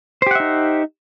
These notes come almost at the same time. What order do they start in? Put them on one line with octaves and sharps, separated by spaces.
C5 G4 F#5 E5 D#4